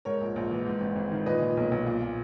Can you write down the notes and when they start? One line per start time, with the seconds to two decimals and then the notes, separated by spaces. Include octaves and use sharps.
0.05 G#2 A#4 C#5
0.21 A#1
0.36 A#1
0.51 E3
0.66 G#2
0.81 G#1
0.96 G#1
1.12 D#3
1.26 A#2 B4 D#5
1.42 A#2
1.57 B1
1.71 B1
1.86 A#2
2.02 A#2